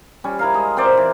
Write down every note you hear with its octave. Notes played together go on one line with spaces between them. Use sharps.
G3 C#4
E4 A#4 F5
G#3 D#5
C4 A#4 C5 D5
E3